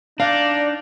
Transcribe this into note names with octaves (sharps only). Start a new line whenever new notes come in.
D4 D#4 D5 F5